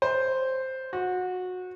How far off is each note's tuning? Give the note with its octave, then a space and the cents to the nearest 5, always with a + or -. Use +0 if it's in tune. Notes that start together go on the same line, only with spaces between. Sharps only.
C5 +0
F#4 -20